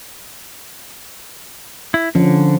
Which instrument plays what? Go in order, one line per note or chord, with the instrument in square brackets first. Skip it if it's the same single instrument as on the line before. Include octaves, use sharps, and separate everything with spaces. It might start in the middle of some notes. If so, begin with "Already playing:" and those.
[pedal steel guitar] E4
[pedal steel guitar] D3 [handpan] F3 C#4